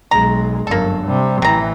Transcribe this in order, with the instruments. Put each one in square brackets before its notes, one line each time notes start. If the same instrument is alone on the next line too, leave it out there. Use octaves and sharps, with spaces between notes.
[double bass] B1 G#3 [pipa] A#5
[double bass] G1 F#2 [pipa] A#3 A4
[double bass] C3 G3
[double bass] A1 E3 [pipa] C3 A#5